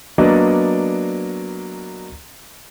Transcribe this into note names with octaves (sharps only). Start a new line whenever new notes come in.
F#3 A#3 B3 D4 D5 D#5